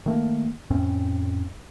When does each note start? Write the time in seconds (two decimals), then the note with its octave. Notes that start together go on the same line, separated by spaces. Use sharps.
0.06 D#3 A3 A#3
0.70 F2 A2 C4 C#4